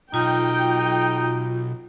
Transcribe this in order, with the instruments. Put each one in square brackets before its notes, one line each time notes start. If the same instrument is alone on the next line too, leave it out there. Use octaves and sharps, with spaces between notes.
[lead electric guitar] B1 [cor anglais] D#4 [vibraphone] F4 [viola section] G5